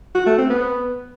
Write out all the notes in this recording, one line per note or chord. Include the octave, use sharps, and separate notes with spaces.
F#4
A3
C4
B3